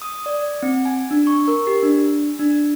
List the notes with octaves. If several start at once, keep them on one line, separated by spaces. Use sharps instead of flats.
D#6
D5
C4
G#5
D4
C#6
A#4
G4
D4
D4